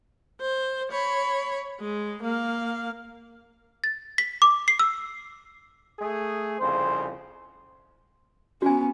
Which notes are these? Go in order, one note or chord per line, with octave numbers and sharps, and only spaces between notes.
C5
C#5 B5
G#3
A#3 F5
A6
B6
D6
C7
E6
A3 G#4
C2 F2 C#3 C5
B3 C#4 F#4 G#5